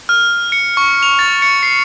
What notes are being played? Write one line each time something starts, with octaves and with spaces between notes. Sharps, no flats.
F6
C#7
C#6
F7
A6
C#7
C7